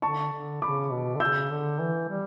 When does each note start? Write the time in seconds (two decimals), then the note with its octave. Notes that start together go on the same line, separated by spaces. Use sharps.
0.02 D3 A5 C#6
0.32 D3
0.62 C#3 B5 D6
0.92 B2
1.15 D3
1.20 C#3 E6 G6
1.50 D3
1.80 E3
2.09 G3